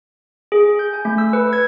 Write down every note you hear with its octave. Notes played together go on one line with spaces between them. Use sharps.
G#4
G6
G#5
A3
E6
B4
G#6